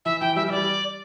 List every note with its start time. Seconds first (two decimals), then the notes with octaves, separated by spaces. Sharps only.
0.05 E3 E5
0.21 E3 G5
0.36 G3 E5
0.47 E3 E5
0.51 D5
0.56 G3